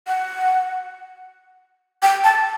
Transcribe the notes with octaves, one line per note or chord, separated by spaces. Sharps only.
F#5
G5
A5